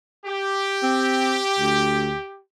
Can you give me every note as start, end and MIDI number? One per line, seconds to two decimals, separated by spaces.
0.25 2.39 67
0.83 1.39 60
1.59 2.15 38